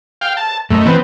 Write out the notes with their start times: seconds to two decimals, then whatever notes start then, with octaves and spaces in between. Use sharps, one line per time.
0.21 F5 G5
0.37 A5
0.70 F#2 A3 A#4 D#5
0.86 E3 B3 C4